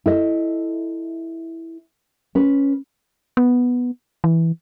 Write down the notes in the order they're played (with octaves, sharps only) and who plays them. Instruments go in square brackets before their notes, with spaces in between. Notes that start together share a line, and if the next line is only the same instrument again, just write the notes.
[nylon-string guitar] E4 A4 D#5
C#4 B4
[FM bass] B3
E3